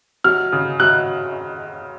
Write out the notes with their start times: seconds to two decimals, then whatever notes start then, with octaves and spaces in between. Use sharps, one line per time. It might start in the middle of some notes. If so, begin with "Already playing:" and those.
0.24 F#3 F6
0.52 C#3
0.80 F#3 F#6